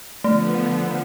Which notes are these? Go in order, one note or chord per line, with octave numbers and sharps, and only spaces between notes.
D3 F3 A3 B3